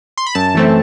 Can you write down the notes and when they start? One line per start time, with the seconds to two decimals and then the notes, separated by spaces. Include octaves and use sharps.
0.18 C6
0.26 B5
0.35 F#2 A5
0.55 E3 A3 C4